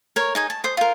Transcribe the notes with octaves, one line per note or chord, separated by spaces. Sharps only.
A#4 C#5
D#4 G#4 G#5
A5
C5 D#6
F4 A#4